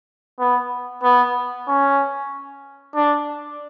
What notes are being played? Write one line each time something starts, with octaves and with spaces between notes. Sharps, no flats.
B3
B3
C#4
D4